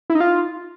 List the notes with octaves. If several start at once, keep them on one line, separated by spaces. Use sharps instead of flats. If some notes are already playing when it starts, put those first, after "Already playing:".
E4
D#4
F4